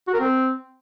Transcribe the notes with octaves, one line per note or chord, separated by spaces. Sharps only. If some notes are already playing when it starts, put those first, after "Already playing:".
F#4
A#4
C4